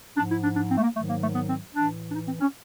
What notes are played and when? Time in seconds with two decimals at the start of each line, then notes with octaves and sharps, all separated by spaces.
0.17 G#2 F3 D4
0.30 E4
0.44 D4
0.56 D4
0.69 C4
0.78 A3
0.82 A#3
0.96 G#2 D#3 F#3 A3
1.09 A#3
1.22 A3
1.35 B3
1.49 C4
1.75 A2 E3 D4
2.10 D4
2.14 D#4
2.27 C4
2.41 C#4